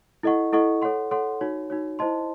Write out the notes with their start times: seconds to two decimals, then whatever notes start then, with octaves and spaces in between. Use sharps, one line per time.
0.23 E4 A4 D#5 F#5 C#6
0.53 E4 A4 D#5 F#5 C#6
0.82 A4 C#5 F#5 C6
1.11 A4 C#5 F#5 C6
1.41 D#4 F#4 C#5
1.70 D#4 F#4 C#5
1.99 E4 C5 D#5 A5 C6